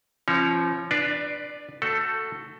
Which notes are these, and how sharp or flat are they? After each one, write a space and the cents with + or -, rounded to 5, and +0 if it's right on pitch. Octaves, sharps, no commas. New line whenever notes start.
F3 -30 C#4 -45 C#5 +10
D4 +20 B4 -10 D5 -5
A3 +15 F#4 +0 A4 +5